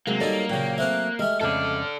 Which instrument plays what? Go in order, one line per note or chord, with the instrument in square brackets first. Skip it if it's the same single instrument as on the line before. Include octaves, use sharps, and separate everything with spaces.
[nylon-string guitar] C3 F#3 G#3 [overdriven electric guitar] A#3
[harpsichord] F#3 G3 D#4 [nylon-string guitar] A4 D#5
[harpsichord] A#2 C#3 [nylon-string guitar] F#3 [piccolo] G5
[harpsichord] A3 C4 F5 [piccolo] F#6
[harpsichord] G#3 A3 [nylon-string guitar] G4 [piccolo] F6
[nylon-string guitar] F2 C#3 [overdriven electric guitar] A4 D5 [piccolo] F6